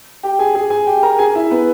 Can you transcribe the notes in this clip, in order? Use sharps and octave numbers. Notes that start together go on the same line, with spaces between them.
G4 G5
G#4 G#5
G#4 G#5
G#4 G#5
G4 G5
A#4 A#5
G#4 G#5
E4 E5
B3 B4